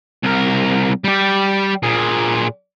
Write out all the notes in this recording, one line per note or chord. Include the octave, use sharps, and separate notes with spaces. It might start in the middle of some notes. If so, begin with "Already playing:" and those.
C2 A#4
G3 G4
A#2 G#4